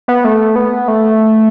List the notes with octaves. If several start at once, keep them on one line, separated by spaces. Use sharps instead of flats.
B3
A3
B3
A3